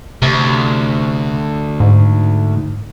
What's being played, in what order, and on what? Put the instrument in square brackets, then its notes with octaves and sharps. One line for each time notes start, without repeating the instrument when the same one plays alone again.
[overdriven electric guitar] D2 [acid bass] C3
[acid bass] G#2